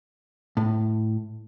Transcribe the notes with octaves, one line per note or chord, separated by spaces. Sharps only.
A2